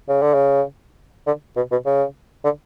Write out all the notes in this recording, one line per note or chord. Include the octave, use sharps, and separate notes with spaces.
C#3
D3
C#3
D3
B2
B2
C#3
D3